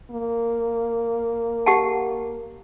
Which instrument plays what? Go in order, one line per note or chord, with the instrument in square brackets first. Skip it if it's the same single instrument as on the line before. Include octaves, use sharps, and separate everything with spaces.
[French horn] A#3
[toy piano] G4 F#5 A5